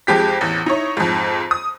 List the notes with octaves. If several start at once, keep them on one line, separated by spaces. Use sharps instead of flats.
F2 G#3 G4 B6
A1 E2
D#4 E4 C#5
F2 G#2
D#6